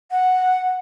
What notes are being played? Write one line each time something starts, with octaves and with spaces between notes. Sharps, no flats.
F#5